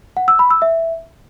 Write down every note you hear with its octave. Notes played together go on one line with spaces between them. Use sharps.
F#5
E6
B5
E6
E5